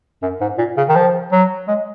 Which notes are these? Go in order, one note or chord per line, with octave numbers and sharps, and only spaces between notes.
F#2
G#2
A#2
C#3
D#3
F3
F#3
G#3